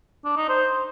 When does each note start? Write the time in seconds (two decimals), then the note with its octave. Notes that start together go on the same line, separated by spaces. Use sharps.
0.25 D4
0.37 D#4
0.49 C5